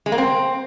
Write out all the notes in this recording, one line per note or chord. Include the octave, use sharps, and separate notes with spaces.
G#3
A#3
C4